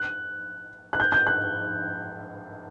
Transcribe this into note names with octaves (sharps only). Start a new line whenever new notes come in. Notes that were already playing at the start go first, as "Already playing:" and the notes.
Already playing: F#6
F#6
G6
G6
F#6